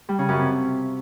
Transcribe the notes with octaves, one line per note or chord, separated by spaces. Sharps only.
G3
C#3
F#2
C3